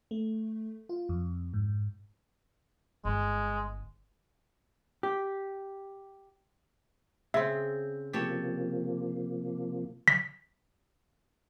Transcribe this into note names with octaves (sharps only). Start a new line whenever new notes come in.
A3
F4
F2
G#2
G1 G#3
G4
C#3 C4 E5
C3 F3 A#3 G4 A4 C#5
B6